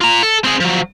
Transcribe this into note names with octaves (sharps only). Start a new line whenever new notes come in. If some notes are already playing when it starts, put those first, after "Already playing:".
F4 A#5
A4
C4 G#4
F3 F#3